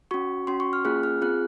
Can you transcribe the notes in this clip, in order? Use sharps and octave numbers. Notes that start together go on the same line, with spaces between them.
C#4 F#4 C#6
C#4 F#4 C6
C#6
F6
A#3 C#4 F4 G#4 F#6
F6
C4 F4 G#4 F#6